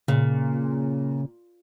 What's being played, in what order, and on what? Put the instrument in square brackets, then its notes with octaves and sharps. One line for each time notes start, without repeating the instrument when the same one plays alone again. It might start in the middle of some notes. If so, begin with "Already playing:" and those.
[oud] A#2 [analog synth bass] C#3